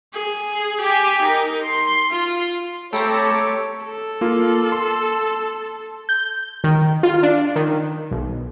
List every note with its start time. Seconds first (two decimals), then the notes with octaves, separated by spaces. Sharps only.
0.14 G#4
0.81 G4 G#5
1.22 D#4 A#4
1.62 C6
2.12 F4
2.93 A3 C4 G4 A4 C#5 A#5 B5 D6
3.85 A4
4.21 A#3 F4
4.72 C6
6.09 G6
6.64 D#3
7.03 F4
7.23 D4
7.56 D#3
8.11 B1